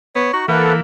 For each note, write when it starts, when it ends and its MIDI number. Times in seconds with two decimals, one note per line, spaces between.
0.15 0.30 59
0.15 0.32 73
0.33 0.45 63
0.33 0.47 66
0.33 0.45 85
0.48 0.81 52
0.48 0.79 58
0.48 0.73 69
0.48 0.73 71
0.48 0.73 76
0.48 0.73 78